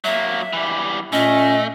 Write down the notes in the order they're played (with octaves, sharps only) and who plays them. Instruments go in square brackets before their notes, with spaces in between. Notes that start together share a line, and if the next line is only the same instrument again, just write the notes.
[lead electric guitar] F#3 A#3 [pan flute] E5
[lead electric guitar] E3 G3
[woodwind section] A#2 C#4 [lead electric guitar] A3 [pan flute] D#5